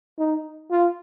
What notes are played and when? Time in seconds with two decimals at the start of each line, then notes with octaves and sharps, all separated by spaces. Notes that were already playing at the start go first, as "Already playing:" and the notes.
0.19 D#4
0.71 F4